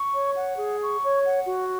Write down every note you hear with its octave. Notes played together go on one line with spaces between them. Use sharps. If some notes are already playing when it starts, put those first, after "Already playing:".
Already playing: C#6
C#5
F#5
G#4
C#6
C#5
F#5
F#4